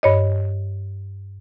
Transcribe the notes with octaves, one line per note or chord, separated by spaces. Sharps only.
G2 C#5 D#5